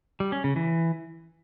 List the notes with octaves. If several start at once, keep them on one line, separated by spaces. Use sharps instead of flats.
G3
C#4
C#3
E3